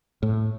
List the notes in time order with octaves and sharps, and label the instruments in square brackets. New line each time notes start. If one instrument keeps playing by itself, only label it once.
[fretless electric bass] A2